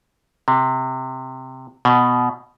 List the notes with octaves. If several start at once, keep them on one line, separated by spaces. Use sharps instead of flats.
C3
B2